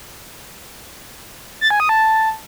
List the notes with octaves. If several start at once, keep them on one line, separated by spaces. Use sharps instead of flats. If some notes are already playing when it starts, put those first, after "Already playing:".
A6
G#5
D#6
A5